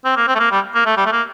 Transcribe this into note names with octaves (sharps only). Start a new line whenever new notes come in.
C4
A#3
C4
A3
A#3
G3
A#3
A3
G3
A3
A#3